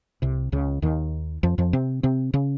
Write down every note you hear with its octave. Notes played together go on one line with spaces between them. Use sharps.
C2 C3
C#2 C#3
D#2 D#3
F2 F3
F2 F3
C3 C4
C3 C4
C#3 C#4